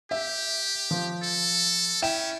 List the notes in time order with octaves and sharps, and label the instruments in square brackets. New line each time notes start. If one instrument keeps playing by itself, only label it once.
[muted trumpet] G4 [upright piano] E5
[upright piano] F3
[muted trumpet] A4
[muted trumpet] C#4 [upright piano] E4 G5 E7